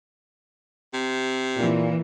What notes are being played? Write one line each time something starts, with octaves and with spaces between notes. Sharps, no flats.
C3
A#2 E3 A#3